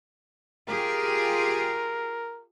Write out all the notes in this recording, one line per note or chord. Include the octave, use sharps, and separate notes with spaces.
F4 G4 G#4 A#4